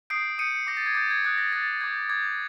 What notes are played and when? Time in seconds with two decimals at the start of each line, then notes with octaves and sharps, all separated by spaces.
0.10 D#6 G6 C7 D7
0.38 D#6 G6 C#7 D#7
0.67 D6 G6 A#6
0.77 A6
0.86 G#6
0.95 D6 G6 A6
1.11 G#6
1.25 D#6 F#6 G#6
1.38 A#6
1.53 D#6 F#6 A6
1.80 D6 G6 G#6
2.09 D6 G6 G#6